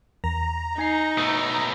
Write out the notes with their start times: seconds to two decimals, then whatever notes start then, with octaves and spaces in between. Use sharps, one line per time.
0.24 E2 A#5
0.79 D#4 G#5 C7
1.17 B2 A3 D#6